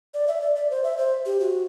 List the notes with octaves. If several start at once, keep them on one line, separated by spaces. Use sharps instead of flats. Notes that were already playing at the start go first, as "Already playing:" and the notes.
D5
E5
D5
D5
C5
E5
C5
G4
F#4